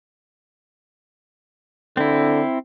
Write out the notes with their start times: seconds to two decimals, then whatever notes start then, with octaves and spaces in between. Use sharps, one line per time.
1.97 D3 C4 E4